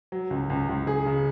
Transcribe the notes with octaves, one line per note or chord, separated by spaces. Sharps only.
F#3
C#2
C#2
C#2
G#4
C#3